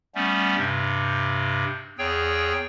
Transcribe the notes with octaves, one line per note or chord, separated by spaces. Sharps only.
G3 A3 B3 C#4
G2 C3
E2 G#4 C#5 G5